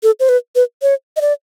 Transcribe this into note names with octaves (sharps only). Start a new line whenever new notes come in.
A4
C5
B4
B4
C#5
D#5
D5